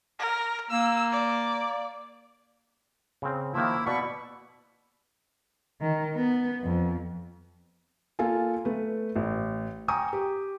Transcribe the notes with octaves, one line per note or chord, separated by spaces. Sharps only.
A#4
A#3 E6
D5
C#3 C4
D#3 F3 A#3 E4
B2 D5 B5 C#6
D#3
B3
F2
A#3 F4 A4 G#5
A3 B4
A1
G5 G#5 A#5 C#6 D#6
G4